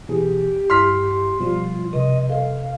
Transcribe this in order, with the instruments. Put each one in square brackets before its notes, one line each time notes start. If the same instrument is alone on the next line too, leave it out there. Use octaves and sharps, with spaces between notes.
[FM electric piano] B2 E3 G#4 [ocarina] G4
[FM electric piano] G2 E4 [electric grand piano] C6 F6 B6
[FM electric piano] B2 F3 G3 [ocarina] F4
[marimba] C3 [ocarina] D#5
[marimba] A4 D#5 [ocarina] F5